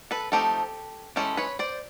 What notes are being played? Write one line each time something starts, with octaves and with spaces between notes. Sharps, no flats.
A4 B4
F3 A3 C4 D#4 G4 A4
E3 G#3 C#4 G4 A4
B4 C#5
C5 D5